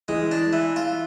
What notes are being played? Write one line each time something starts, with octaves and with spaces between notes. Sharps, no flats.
E3 G#3
D4
E3
F4